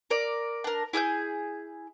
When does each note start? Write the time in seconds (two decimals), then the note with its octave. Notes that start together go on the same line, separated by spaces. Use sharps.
0.10 A#4 D5
0.64 D4 A#4
0.93 E4 G#4 E6 G6